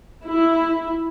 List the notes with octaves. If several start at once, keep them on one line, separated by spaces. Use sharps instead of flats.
E4